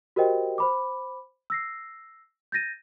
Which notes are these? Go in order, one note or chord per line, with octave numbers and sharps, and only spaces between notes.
F#4 G4 A#4 C5 D#5 G5
C5 B5 D6
E6 A#6 C7
G6 A6 A#6 D#7